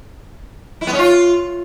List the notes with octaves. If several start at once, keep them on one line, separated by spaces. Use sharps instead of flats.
E4
B3
C#4
F4